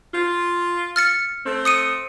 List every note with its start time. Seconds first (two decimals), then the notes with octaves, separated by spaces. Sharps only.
0.12 F4
0.96 F6 A6 C#7
1.45 A3 C4
1.65 D#6 C#7 D#7